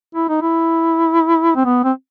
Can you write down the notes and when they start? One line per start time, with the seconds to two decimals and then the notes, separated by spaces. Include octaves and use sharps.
0.15 E4
0.29 D#4
0.42 E4
1.55 C4
1.65 B3
1.84 C4